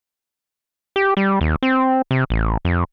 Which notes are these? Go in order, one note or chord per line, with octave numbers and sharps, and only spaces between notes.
G4
G3
D#2
C4
C3
A1
F2